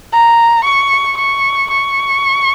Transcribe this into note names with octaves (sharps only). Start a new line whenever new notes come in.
A#5
C#6
C#6
C#6